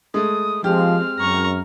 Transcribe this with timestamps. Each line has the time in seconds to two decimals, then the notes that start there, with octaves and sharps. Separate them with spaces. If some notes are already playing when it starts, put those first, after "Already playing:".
0.14 G#3 A3 D#6
0.64 F3 G#3 C4 G4 F6
1.19 F#2 A#5 C#6